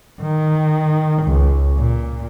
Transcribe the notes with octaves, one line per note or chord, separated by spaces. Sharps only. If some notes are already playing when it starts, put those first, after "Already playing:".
D#3
C#2
A#2